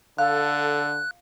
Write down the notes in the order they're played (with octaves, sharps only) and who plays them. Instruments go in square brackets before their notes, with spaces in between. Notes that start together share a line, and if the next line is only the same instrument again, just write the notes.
[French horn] D3 [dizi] A4 [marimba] F5 [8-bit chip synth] F#6